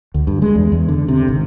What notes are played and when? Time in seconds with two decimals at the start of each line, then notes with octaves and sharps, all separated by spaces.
0.14 D2
0.27 G2
0.42 G#3
0.55 E2
0.72 E2
0.89 D3
1.08 C3
1.28 G#1